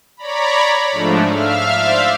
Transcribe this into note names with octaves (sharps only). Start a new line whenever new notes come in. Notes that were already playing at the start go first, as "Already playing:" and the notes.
C#5 D5 A#5 B5
G#2 F3 A3 D4
E5 F5 F6
C5 D5 E5 F5